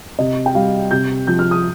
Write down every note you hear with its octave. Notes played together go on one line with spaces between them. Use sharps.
C3 D#5
G5
G3 F5
C3 G6
F3 G6
F6
D#6